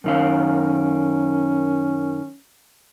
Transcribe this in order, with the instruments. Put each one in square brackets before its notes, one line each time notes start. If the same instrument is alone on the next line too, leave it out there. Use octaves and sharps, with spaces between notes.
[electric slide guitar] F#2 D#3 F5 [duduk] C#4